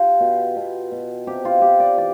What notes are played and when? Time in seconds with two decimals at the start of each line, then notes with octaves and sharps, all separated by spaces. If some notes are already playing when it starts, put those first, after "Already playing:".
Already playing: F4 G4
0.20 B2
0.56 B2
0.92 B2
1.27 C3 G4
1.45 F4
1.62 C3 G4
1.80 D5
1.97 E3 D5